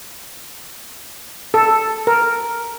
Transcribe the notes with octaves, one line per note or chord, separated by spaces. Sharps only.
A4
A#4